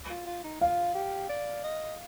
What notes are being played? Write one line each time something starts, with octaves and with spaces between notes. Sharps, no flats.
F4
F4
D#4
F4 F5
G4
D5
D#5